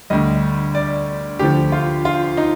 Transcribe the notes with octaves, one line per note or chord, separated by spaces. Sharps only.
D2 D3 G3 D#5
D5
D2 D3 F3 G4
F4
F4
D#4